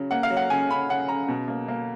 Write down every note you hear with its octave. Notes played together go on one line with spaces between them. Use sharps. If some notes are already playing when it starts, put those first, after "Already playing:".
Already playing: C#3 F#3
A#3 F#5
F5
F#3
F#5
C#3 G#5
C#3 B5
C#3 F#5
C#3 A#5
B2
A#3
A#3